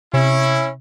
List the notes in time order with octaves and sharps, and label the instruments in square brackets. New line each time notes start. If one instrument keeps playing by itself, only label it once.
[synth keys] C3 [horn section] C#4 E4